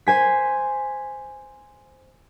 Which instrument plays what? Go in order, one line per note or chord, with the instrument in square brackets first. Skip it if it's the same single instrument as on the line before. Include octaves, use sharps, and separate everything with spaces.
[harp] C5 G#5 B6